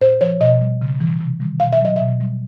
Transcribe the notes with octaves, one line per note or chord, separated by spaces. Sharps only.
A#2 C5
F3 C#5
B2 D#5
G3
C#3
E3 G3
C3
D#3 G3
B2 F5
E5
F#3 D#5
B2 E5
G3